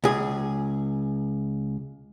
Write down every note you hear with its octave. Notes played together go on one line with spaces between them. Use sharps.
C#2 G#4